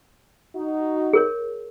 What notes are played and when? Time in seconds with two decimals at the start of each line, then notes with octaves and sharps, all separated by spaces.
0.56 D#4 F#4
1.13 G#4 A#4 C#5